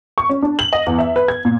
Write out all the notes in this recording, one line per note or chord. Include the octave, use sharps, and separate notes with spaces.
C#6
C#4
D4
F#7
D#5
E2
E5
B4
G#6
A#2